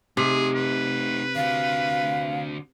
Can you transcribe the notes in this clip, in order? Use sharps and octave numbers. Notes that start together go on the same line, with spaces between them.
C3 A3 D#4 G#4
B4
D3 F#4 F5